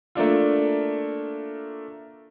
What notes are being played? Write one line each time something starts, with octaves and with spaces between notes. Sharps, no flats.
A3 A#3 D4 F4